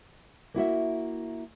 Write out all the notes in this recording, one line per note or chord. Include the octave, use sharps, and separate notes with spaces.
A#3 E4 F#4 E5